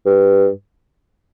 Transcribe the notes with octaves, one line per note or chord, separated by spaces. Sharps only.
G2